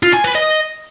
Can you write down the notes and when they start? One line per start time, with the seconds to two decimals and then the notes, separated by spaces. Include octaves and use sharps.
0.03 F4
0.13 G#5
0.24 B4
0.35 D#5